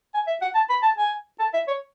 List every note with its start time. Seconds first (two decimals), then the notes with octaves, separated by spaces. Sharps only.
0.14 G#5
0.27 E5
0.41 F#5
0.55 A5
0.70 B5
0.83 A5
0.97 G#5
1.40 A5
1.54 E5
1.68 C#5